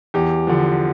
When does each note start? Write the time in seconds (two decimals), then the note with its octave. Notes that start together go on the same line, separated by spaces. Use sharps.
0.14 E2 G4
0.47 D3 F3